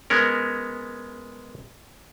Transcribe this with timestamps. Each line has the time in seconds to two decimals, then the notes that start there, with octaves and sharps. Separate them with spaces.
0.10 G#3 B3 C#4 A#4